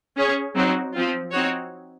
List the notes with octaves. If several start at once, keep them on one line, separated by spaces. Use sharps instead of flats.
C#4 G#4 C#5
F#3 C4 D#4 F#4
F3 C4 F4
C4 D#4 F#4 C#5